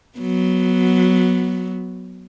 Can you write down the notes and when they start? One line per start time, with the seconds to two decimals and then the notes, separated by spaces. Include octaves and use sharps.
0.18 F#3 B3